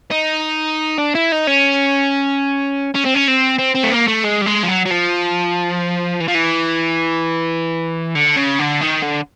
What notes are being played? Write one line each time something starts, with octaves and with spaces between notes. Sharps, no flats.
D#4
D4
E4
D#4
C#4
C#4
C4
C#4
C4
C4
C4
A3
A#3
A3
G#3
G3
G#3
F3
F#3
F#3
F3
E3
F3
E3
D3
C#3
D3
D#3
D3